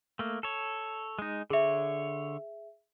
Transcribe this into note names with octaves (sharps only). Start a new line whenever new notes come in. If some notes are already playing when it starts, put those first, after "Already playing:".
A3 A#3
A4 C#5
G#3 D#4
D3 G#4 C#5 E5